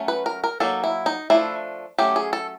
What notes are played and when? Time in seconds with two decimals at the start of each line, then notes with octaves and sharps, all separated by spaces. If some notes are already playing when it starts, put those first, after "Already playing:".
Already playing: F#3 A3 C#4
0.08 B4
0.26 A#4
0.44 A#4
0.60 F#3 A#3 D#4 A4
0.84 E4
1.06 D#4
1.30 F3 A3 D4 E4
1.98 F#3 A3 C#4 G4
2.16 G#4
2.33 A4